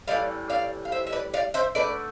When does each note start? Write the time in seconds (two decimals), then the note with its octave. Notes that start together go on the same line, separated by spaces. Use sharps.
0.08 A2 E3 G3 D5 F5
0.50 D5 F5
0.85 F5
0.92 C5 E5
1.07 E5
1.12 B4 D5
1.34 D5 F5
1.54 C5 E5
1.75 D3 A3 B4 D5